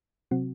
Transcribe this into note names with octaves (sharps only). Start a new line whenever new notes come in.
C3 F#3 C4 F#4